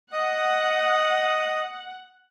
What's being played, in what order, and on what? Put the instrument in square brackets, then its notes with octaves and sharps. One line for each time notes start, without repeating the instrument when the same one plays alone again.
[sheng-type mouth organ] D#5 D#6 [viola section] F#5